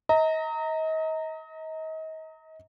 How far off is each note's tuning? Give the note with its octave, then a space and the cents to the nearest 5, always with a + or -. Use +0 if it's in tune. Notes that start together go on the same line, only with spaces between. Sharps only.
D#5 +35 A#5 -20